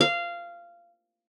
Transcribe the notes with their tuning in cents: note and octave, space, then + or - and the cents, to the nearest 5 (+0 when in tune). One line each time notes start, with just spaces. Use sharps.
F5 -15